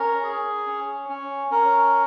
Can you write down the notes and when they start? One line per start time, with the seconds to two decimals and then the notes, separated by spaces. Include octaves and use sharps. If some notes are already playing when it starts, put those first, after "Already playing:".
Already playing: C#4 A#4
0.23 G#4
0.66 C#4
1.09 C#4
1.51 C#4 A#4